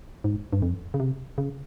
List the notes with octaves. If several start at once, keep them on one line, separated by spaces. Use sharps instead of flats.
G#2
G2
F2
C#3
C3
C#3